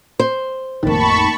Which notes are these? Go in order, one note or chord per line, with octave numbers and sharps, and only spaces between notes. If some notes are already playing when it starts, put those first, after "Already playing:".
C5
A1 F2 D#3 A#3 A5 B5 C#6